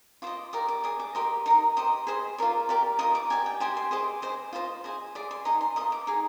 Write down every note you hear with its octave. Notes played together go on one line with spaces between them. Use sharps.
F4 C5 D#5 D6
G4 A#4 D5 D#6
D6
G#4 D5 D#6
D6
G4 A#4 D#5 C6
D#4 A#4 D#5 A#5
G4 C5 D#5 D#6
G#4 C5 D#5
F4 A#4 D5
G4 A#4 D5
F4 A#4 D#5 D#6
D6
G4 D5 G#5
G5
G4 C5 D#5 G#5
C6
G#4 C5 D#5 D6
G#4 C5 D#5
F4 C5 D#5
G#4 C5 D#5
G#4 D5 D6
C6
D#4 G#4 D#5 A#5
C6
F4 A#4 D#5 D#6
D6
D#4 G#4